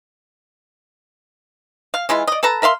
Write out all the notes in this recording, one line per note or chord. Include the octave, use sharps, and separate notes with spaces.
F5
E3 G#3 E4 F4
D5 D#5
A4 B4 A5 A#5
A#4 E5 F5 C6